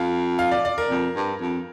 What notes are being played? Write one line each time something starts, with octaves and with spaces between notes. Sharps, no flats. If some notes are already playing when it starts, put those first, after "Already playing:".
Already playing: F2 F5
F5
D5
D5
A#4
F2
G2
F2